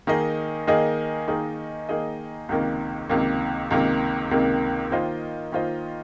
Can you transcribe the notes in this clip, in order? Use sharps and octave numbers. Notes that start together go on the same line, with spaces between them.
D#3 A#3 D#4 G#4 D#5
D#3 A#3 D#4 G#4 D#5
D#3 A#3 D#4 G#4 D#5
D#3 A#3 D#4 G#4 D#5
C#2 C3 D#3 A#3
C#2 C3 D#3 A#3
C#2 C3 D#3 A#3
C#2 C3 D#3 A#3
D#3 A#3 F4 C5 D#5
D#3 A#3 F4 C5 D#5